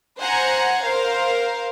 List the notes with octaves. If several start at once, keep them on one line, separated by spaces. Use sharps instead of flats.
C5 F#5 G#5 A#5 G#6
A#4 C5 F5